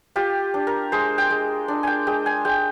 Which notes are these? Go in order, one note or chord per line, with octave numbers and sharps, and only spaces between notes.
F4 G4
D4
A#4
G#3 C5
G5
G#3
D4
G5 G#5
G#3 G5
G#5
G#3 G5